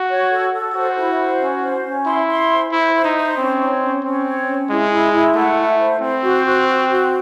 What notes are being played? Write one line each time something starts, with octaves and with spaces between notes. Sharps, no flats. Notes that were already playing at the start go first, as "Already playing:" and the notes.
Already playing: F#4
C#5
A4
A4
F#4 C5
E4
C5
C#4
C5
C#4
E4 C6
C6
C5
E4 C5
C5
D#4
C5
C4 C#4
C#5
C#4
C4 C#4
C#5
C#4
G#3 E4
E4
E4
A3 F#5
E4
C5
C4 C5
F#4
F#4
F#4
F#4